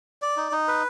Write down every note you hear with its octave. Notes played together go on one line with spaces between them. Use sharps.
D5
D#4
D#4
B4